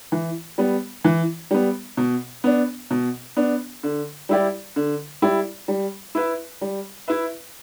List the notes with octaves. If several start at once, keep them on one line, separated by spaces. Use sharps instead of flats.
E3
G3 B3
E3
G3 B3
B2
B3 D4
B2
B3 D4
D3
G3 E4 G4 D5
D3
G3 E4 G4 D5
G3
E4 B4 E5
G3
E4 B4 E5